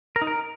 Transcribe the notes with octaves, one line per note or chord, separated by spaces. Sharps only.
A#4
D#4
A#4